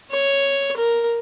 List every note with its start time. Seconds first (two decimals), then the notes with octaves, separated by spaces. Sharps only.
0.11 C#5
0.76 A#4